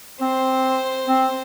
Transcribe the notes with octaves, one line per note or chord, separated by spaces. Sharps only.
C4 C5
C4